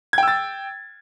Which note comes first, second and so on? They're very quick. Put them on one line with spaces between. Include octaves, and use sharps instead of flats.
G#6 G5 E6 A6